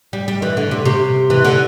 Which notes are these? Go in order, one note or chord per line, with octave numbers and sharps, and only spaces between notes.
G3
G3
E3
D3
C3
C3
E3
D3